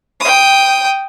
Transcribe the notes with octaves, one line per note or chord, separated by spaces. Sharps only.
G5 D#6